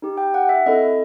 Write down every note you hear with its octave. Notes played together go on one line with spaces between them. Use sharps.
D#4 G4
G5
F#5
E5
C4 E4 A4 D#5